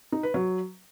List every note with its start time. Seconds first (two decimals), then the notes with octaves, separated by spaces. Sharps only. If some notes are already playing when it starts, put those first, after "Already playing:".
0.12 D#4
0.23 B4
0.34 F#3